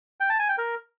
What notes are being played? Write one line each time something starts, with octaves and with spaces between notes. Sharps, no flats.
G5
A5
G#5
G5
A#4